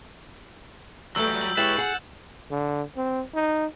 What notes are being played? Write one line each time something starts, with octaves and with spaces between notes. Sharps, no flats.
E2 F#3 G3 A3 E6 G6
F#7
G#3 E4 G4 B4 C#5 A6 E7 F#7
G#4 F#5
D3
C4
D#4